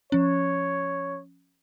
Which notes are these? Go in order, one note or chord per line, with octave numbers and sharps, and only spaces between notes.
F3 C#4 C#5